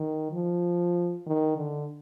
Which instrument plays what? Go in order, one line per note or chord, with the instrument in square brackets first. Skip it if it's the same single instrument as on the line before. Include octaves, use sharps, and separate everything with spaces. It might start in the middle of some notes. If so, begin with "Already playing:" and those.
Already playing: [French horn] D#3
F3
D#3
D3